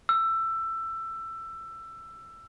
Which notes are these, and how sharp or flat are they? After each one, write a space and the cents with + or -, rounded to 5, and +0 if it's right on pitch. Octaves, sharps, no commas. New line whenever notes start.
E6 +15